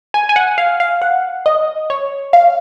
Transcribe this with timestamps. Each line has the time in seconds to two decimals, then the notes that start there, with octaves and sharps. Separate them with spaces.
0.14 G#5
0.29 G#5
0.36 F#5
0.58 F5
0.80 F5
1.02 F#5
1.46 D#5
1.90 C#5
2.33 F5